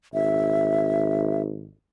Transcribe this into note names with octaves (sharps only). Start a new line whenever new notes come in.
G#1 E5